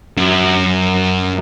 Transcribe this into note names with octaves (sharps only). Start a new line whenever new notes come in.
F#2